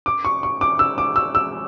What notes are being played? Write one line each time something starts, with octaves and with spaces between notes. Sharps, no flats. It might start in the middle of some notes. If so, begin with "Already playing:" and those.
D6
C#6
C#6
D6
E6
D6
E6
E6